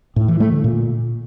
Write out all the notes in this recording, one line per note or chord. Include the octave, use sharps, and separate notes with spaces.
A2
E3
A3
D3
A#2